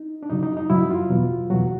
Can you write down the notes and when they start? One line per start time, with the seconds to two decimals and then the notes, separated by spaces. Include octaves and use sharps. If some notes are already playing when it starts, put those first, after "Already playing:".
Already playing: D#4
0.23 D4
0.30 F#2 C#3 F#3 D#4
0.43 D#4
0.57 D#4
0.70 F#2 C#3 F#3 E4
0.90 F4
1.10 E2 B2 F#3
1.50 E2 B2 F#3 F#4